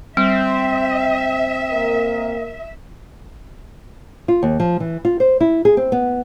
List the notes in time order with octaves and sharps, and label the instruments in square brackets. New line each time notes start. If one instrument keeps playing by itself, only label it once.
[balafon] G3 [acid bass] C4 [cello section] E5
[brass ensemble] A#3 A#4
[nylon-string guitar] F4
D#2
F3
E3
F4
C5
E4
G#4
C4
B3